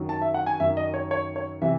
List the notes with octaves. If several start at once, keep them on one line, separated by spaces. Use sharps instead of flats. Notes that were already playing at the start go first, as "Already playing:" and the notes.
Already playing: F#2 D#3 F#3
A5
E5
F#5
G#5
F#2 D#3 F#3 E5
D#5
C#5
C#5
C#5
C3 E3 E5